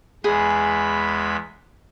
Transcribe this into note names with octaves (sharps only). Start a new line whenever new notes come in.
E2 G#3 G#4 B5